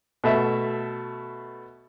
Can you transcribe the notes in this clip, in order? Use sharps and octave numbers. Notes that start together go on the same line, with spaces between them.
B2 A3 E5